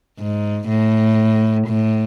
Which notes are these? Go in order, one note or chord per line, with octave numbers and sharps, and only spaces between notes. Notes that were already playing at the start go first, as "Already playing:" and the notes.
G#2
A2
A2